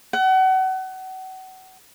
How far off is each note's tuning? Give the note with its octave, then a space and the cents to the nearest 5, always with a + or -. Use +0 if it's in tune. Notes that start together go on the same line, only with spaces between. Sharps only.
F#5 +30